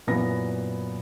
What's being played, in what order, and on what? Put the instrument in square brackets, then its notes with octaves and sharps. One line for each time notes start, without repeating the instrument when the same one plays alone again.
[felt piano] F#2 A#2 E3 B3 A#6